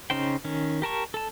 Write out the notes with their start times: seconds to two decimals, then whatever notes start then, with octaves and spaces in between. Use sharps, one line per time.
0.10 C#3 C#4 D#4 C5 G5
0.45 D#3 C#4
0.82 G4 A#4 A5 C#6
1.14 A4 A5